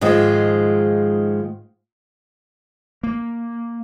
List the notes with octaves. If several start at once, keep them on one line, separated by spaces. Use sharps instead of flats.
G#2 D#3 F3 G#3
A#3